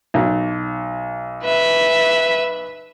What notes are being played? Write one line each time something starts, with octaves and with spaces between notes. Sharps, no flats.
B1
B4 E5